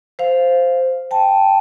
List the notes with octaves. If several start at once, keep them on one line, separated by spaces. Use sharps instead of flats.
C5 F5
G5 A5